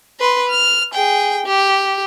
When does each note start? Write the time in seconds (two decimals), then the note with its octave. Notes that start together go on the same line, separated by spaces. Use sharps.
0.20 B4 C6
0.49 F6
0.94 G#4 G5
1.46 G4